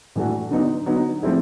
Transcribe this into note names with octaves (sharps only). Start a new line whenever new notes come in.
A2 E3 A3 D4 F#4
D3 F#3 B3 D#4
D3 F#3 B3 D#4
F3 A3 C4 E4 G#4